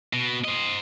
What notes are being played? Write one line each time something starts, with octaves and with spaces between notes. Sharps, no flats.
B2
C5 D#5